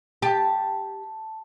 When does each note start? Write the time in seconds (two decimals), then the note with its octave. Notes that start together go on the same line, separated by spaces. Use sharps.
0.22 G4 A5